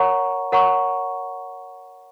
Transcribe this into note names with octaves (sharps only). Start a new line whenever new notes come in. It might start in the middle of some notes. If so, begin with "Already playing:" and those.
Already playing: A#4 C#5 F#5 A#5 C#6
A#4 C#5 F#5 A#5 C#6